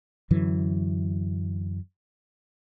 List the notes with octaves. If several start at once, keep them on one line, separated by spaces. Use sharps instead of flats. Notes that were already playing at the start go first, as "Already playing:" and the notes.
F#2 D3 E3 F#3